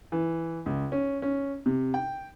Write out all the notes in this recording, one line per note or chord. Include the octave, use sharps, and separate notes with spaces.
E3
C#2
C#4
C#4
C3
G5